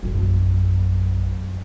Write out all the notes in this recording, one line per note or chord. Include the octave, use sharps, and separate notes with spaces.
A#1 F#2